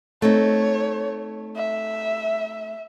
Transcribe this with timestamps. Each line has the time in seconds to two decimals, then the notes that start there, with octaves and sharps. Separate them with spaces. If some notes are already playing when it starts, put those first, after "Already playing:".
0.22 A3 C4 D#4 C#5
1.56 E5